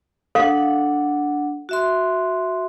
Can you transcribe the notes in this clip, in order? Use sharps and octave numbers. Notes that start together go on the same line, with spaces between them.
D4 A4 F5 F#5
F#4 E5 C6